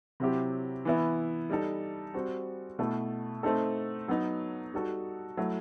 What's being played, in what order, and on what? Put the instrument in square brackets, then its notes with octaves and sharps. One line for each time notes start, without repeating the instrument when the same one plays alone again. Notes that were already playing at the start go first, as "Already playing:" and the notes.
[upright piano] C3 F#3 C4 E4 G4
E3 B3 E4
G3 D#4 A4
G3 C4 F#4
B2 A3 E4 A4
A3 C4 D#4 A4
F#3 B3 D#4
G3 D#4 F#4 A4
F#3 A3 E4